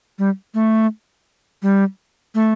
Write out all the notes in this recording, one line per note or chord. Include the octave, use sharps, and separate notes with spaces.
G3
A3
G3
A3